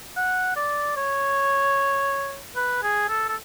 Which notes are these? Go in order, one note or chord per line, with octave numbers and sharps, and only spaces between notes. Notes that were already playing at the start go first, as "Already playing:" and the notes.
F#5
D5
C#5
B4
G#4
A4
A4